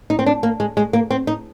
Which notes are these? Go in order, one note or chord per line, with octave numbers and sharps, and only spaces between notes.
D#4
C4
D4
A#3
G#3
G#3
A#3
C4
D#4